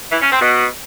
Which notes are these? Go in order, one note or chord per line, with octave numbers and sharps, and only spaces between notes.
E3
C#4
C4
B2